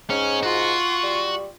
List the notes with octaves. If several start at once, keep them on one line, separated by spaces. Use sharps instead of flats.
G#2 C#4
F4 F#4
G3